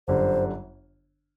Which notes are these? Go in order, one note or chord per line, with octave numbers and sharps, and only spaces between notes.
G1 F#2 D3 G3 C5